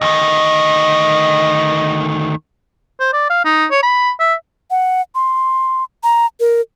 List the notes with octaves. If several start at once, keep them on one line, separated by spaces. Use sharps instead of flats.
D2 D#3 D#5
C5
D5
F5
D#4
C#5
B5
E5
F#5
C6
A#5
A#4